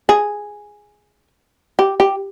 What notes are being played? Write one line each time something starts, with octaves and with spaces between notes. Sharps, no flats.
G#4
G4
G4